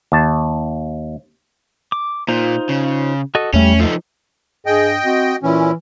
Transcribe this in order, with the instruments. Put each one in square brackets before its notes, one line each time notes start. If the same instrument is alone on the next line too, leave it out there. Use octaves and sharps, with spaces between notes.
[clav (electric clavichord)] D#2 A5
[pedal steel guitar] D6
[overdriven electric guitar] A#2 [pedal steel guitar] D#4 F4 C5
[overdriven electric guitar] C#3
[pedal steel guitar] F#4 A4 D#5
[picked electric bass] E2 A3 [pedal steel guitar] G3 [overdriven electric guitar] C#4
[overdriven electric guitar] F3 D#4 [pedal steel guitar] A4
[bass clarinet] G2 [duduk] G#4 [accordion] D#5 G5
[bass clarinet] C4 [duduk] F#4
[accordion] A#2 C#4 [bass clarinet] E3 [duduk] E4